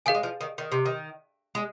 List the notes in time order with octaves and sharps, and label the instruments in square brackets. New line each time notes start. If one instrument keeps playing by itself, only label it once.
[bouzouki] D#3 [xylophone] G#4 F5 G#5
[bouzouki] G#3
F3
D#3
D#3
C3
D#3
G#3